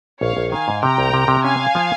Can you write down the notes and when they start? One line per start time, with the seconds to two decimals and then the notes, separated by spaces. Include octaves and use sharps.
0.21 A#1 C#5 F5
0.37 A#1
0.52 D#3 F5 G#5
0.68 G#2
0.82 C3 G5 A#5
0.98 C2
1.14 C3
1.28 C3
1.44 C#4 F5 G#5
1.59 C#4
1.75 F3